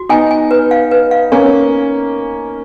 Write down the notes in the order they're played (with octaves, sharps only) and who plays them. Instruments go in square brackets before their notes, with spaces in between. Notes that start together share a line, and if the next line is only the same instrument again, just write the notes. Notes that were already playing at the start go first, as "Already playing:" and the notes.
Already playing: [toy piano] F#4
[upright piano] B3 D#4 [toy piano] G#5
[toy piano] G#5
B4
F5
B4
F5
[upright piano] A#3 C#4 [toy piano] G#5